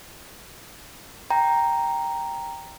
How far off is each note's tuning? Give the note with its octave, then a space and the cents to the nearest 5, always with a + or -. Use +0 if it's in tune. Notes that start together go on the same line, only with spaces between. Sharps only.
G5 +0 A#5 +0